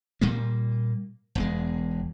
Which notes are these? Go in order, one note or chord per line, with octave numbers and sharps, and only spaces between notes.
A#2 G3 A#3
E1 E2 G#3